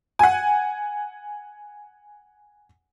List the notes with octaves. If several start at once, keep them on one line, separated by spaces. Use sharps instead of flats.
F#5 G#5